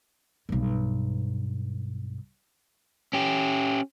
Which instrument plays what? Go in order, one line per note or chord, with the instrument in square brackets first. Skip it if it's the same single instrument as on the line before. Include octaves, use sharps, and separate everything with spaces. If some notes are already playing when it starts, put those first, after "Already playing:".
[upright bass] B1 G2
[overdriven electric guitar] C#4 G4